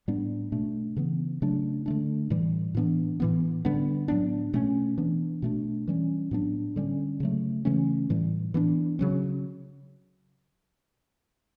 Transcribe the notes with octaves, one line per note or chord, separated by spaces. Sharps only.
A2 G3 B3 D4
B2 A3 D4
C#3 E3 B3
C#3 F#3 A3 D4
D3 A3 D4
A2 E3 G3
A2 E3 B3 D4
A2 E3 B3
D3 G3 B3 D4
A2 F#3 B3 D4
B2 A3 C#4
E3 B3 D4
B2 A3 D4
E3 G3 C#4
A2 F#3 B3 D4
D3 G3 C#4
C#3 F#3 A3
C#3 E3 A3 C#4
A2 E3 G3
E3 B3 D4
C#3 F#3 C#4